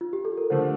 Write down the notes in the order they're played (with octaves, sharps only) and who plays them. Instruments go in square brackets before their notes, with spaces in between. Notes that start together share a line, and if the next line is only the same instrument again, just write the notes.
[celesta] F4
G4
A4
A#4
[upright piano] D3 F3 A3 [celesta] C5